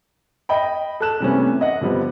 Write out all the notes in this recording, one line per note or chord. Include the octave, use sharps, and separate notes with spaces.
D#5 G5 B5
A4 A5 F#6 E7
C3 E3 G3 A3 B3 C#4
D#5 F#5
D3 F3 G3 B3